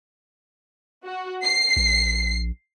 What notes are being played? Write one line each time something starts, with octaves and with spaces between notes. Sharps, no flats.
F#4
C7
A#1